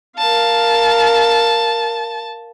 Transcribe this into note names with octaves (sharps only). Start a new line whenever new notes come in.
A#4 F5 A5